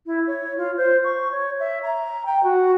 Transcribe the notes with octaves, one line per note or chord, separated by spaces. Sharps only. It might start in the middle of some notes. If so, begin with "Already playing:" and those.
E4
C#5
F4
C5
C#6
C#5
E5
A#5
G5
F#4